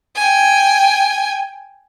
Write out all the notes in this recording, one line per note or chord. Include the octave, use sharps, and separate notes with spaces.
G5 G#5